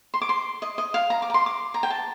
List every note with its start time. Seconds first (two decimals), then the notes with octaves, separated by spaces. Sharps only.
0.14 C6
0.22 D6
0.29 C6
0.62 D#5
0.78 D#5
0.94 F5
1.10 A#5
1.22 D6
1.30 A#5
1.34 C6
1.46 D6
1.74 A#5
1.83 G5
1.90 A5